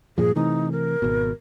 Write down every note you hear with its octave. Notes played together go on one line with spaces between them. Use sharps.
G2 A#2 F3 G#4
C3 E3 A3 D#4
A#4
G#1 B2